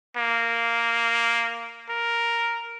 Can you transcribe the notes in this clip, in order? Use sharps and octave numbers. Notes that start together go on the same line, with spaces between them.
A#3
A#4